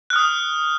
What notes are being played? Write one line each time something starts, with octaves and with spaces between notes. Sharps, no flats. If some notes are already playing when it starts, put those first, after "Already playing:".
D#6 F6 F#6